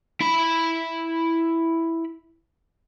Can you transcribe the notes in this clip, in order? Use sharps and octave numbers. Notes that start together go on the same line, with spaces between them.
E4 B5